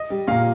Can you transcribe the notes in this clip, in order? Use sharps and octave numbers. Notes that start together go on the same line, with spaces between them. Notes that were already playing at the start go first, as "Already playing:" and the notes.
Already playing: D#5
G3
A#2 F5